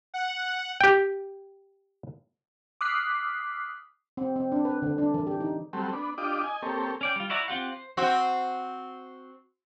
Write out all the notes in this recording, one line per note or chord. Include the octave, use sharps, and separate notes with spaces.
F#5
G4 G5
D6 D#6 F6 F#6 B6 C7
C4
C4
D4
B4
D3
D4
E3
G4
D#4
F#3 G3 A3 C4
B3 D4
D4 F4 G4 D#5 D6
D#5 G#5
A#3 C4 G4 A4 C#5
C#4 D5 G5
G3 F4
E4 F#4 D5 E5 A#5
C4 F4 G4 F#5
C5
C4 F#4